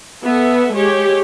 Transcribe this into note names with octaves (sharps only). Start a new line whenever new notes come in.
B3 A4 E5
G#3 G4 C#5